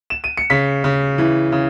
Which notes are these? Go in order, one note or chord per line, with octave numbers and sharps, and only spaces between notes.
E7
D#7
C#7
C#3 B6
C#3
E3
C#3